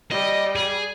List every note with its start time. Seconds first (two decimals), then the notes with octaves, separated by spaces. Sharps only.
0.11 G3 D#5
0.56 G#4